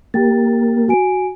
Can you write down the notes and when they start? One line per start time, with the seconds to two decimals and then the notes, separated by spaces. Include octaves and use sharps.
0.14 A#3 G4 G5 A6
0.88 F#4 G#5 D7